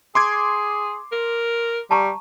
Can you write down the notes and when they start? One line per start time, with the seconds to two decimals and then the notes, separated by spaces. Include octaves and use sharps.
0.15 G#4 C6 D6 G#6
1.12 A#4
1.91 G3 A5 A#5 C#6